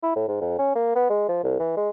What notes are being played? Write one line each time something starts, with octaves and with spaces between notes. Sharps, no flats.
E4
A2
G#2
F2
C#4
A#3
B3
G#3
F3
C2
E3
G#3